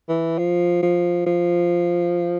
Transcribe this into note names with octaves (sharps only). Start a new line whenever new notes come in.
E3
F3
F3
F3